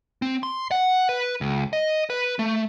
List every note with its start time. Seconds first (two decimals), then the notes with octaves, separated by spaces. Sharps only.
0.22 C4
0.43 C6
0.71 F#5
1.09 B4
1.41 C#2
1.73 D#5
2.10 B4
2.39 A3